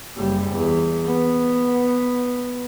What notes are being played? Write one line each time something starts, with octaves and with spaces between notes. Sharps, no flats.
F#1 G3
E2
B3